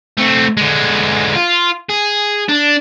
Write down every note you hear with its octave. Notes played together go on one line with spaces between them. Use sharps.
A3 C4
D3 G#3
F4
G#4
D4